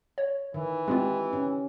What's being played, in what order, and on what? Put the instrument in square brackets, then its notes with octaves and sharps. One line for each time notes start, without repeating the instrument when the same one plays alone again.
[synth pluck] C#5
[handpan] D#3 [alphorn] E3
[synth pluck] G#3 C4 F4 [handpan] G4
[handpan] C#4